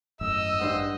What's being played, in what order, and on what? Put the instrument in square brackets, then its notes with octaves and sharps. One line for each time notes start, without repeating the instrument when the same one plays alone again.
[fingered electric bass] G#1 F#2 A2 [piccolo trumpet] D#5 [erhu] E6
[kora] G2 C5 F#5